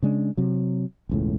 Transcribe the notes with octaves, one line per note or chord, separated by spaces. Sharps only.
C#3 G#3 D4
C3 F#3
E1 C#2 A2